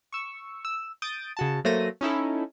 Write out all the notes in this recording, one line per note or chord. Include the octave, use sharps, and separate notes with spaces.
C#6 E6
E6
D#6 G6 A6 D7 D#7
C#3 F#4 A5
F#3 A3 A#3 C5 A#6 D#7
C#4 D#4 E4 A4